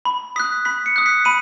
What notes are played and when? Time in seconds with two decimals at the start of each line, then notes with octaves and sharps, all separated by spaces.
0.05 B5
0.36 D#6 F#6 B6
0.65 B5 B6
0.86 C#7
0.96 D#6 F#6
1.06 B6
1.25 B5 D#7